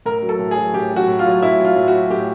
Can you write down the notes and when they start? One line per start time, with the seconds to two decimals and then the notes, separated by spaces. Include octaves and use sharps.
0.06 A2 A#4
0.22 F#3
0.29 A4
0.39 A2
0.51 G#4
0.57 F#3
0.74 A2 G4
0.91 F#3 F#4
1.08 A2
1.19 F4
1.25 F#3
1.42 A2 E4
1.60 F#3
1.65 F4
1.76 A2
1.88 F#4
1.93 F#3
2.10 A2 G4